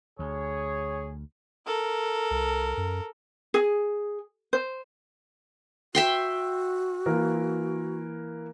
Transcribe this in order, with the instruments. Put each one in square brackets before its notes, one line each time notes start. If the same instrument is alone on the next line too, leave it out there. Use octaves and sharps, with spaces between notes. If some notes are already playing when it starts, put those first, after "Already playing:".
[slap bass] D2 [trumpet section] G#4 C#5
[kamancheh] A4 A#4
[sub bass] C2
F#2
[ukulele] G#4
C5
[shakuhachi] F#4 [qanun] E5 G5 C6
[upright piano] E3 A#3 A#4